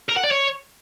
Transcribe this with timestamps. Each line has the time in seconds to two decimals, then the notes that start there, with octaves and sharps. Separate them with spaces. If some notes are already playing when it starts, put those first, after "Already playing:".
0.09 A#4
0.17 F#5
0.24 D5
0.32 C#5